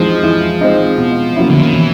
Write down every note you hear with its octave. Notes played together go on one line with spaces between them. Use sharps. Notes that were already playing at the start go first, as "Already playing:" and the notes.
Already playing: E3 F3 G#3 C4 D#4
E3
G#3 C4 D#4
B2
F#3 A#3 C#4 E4
D3
D#3
B2 E3